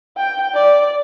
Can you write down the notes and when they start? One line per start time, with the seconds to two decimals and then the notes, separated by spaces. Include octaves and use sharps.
0.17 G5
0.54 D5